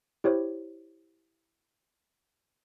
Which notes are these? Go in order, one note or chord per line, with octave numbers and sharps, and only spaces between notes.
E4 G4 C5 C#5